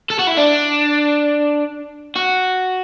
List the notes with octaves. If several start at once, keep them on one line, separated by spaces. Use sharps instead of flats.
A4
F#4
E4
D4
F#4